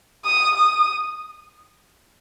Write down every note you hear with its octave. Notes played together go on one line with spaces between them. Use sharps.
D#6
D#6